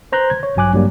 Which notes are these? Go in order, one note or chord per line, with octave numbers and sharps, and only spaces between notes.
B4 C5 A#5 C6 F#6 G6
G#6
C#5
A1 G2 F#3 G#5 D6 F#6
G2 F#3 G3 A#3